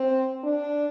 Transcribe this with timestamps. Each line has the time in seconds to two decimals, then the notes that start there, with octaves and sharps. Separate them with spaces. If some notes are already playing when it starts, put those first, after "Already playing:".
Already playing: C4
0.44 D4